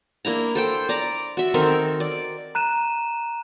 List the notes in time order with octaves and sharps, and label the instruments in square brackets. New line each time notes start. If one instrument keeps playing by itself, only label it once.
[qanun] A#3 D4 E4 A#5
A4 C5 G5
D5 A#5 D6
F#4 E5
D#3 C4 A4 A#4
D5
[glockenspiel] A#5 F#6 D#7 E7